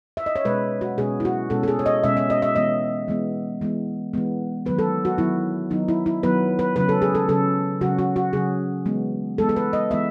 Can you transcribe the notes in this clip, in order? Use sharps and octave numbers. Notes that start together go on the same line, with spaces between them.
E5
D#5
C#5
B2 G#3 C#4 B4
F#4
B2 G#3 C#4 G#4
E4
F#4
B2 G#3 C#4 A4
A4
G#4
C#5
D#5
B2 G#3 C#4 E5
E5
D#5
E5
E3 G#3 B3 D#5
E3 G#3 B3
E3 G#3 B3
E3 G#3 B3
D#3 F#3 B3 B4
A4
F#4
D#3 F#3 B3 E4
D#3 F#3 B3 D#4
E4
E4
D#3 F#3 B3 B4
B4
C#3 F#3 C#4 B4
A4
G#4
A4
C#3 F#3 C#4 A4
C#3 F#3 C#4 F#4
F#4
F#4
C#3 F#3 C#4 G#4
E3 G#3 B3
E3 G#3 B3 A4
A4
B4
D#5
E3 G#3 B3 E5